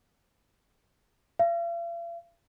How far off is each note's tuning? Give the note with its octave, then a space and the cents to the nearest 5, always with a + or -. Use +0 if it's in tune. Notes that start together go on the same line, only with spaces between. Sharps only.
F5 -45